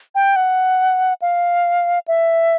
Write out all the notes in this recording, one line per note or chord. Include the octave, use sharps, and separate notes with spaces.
G5
F#5
F5
E5